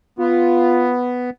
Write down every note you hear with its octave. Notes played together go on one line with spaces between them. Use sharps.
B3 F4